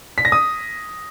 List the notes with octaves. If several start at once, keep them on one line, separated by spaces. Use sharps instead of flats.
B6
A#6
D#6